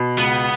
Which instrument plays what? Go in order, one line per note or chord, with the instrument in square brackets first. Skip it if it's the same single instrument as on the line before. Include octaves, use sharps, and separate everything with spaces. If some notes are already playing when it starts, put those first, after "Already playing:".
Already playing: [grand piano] B2
[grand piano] C#2 [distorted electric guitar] B3